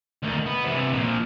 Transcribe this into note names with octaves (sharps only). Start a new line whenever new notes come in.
D2 D#3
B3
C3 E3
A#2 F3